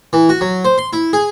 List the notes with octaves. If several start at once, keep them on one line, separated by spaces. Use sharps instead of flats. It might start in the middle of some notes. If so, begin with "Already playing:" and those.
E3
F#4
F#3
C5
C6
E4
G#4